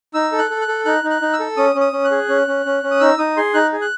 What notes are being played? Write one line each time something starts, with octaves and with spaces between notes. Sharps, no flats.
D#4 E6
A4
F#6
A4
F#6
A4
D#4 F#6
D#4
F#6
D#4
E6
A4
C#4 D#6
C#4
D#6
C#4
F#6
G#4
C#4
C#4
C#4
C#4
D#6
D#4 E6
D#4 D#6
G#4 C6
D#4 F#6
G#4
F#6